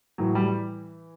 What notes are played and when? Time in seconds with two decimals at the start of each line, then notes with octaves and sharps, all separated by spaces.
0.18 A2 E3 F#3
0.35 G3